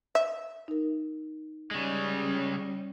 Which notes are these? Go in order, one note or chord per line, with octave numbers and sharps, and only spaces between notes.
E5
D#4 A#4
C#3 G3 G#3 C#4